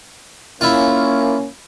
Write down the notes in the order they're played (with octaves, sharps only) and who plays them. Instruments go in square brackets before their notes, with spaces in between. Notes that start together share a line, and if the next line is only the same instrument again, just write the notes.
[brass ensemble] A#3 C#4 [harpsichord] E4 F4